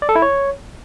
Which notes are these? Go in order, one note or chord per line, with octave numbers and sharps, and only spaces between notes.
D5
A4
E4
C#5